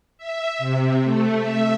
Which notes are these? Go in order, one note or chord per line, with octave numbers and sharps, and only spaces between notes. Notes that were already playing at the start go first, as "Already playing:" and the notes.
E5
C3
A3
E5